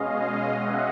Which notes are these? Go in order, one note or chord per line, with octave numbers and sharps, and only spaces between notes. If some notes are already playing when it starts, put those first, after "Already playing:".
Already playing: B2 G#3 C#4 D#5 F5
E5 F#5